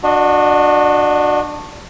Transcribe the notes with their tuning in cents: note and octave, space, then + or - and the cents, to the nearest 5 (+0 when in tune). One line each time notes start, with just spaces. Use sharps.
D4 +15 F#4 -20 D#5 -20